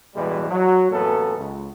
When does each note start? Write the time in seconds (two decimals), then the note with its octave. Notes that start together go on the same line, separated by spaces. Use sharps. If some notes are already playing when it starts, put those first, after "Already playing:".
0.16 A1 E2 B2 E3 G3 G#3
0.50 F#3
0.91 A1 F#2 A#3 B3 C#4 A4
1.38 C#2